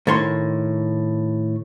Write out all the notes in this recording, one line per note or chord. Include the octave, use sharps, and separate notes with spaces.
A2 D#3 C#5 C6